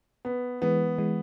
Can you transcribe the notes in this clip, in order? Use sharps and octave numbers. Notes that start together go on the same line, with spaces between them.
B3
E3 G#3 B3
E3 G#3